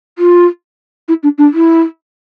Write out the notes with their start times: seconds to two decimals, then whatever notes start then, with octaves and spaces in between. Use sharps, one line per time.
0.18 F4
1.08 E4
1.23 D4
1.38 D4
1.54 E4